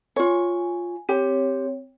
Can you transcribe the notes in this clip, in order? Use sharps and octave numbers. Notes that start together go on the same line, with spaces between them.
F4 C#5 G#5
C4 G4 C#5